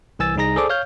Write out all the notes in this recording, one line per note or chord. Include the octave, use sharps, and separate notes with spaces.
C2 E3 G#5 E6 A6
C2 D#4 G#4 A#5 A#6
G#4 A4 C5 D5 D6
C#5 F5 F6 G6